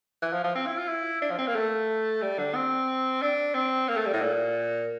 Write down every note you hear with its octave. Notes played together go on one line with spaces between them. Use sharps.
E3
F3
F3
C4
E4
F4
E4
D4
F3
C4
A#3
A3
G3
D3
C4
D4
C4
A#3
A3
G3
A2
A#2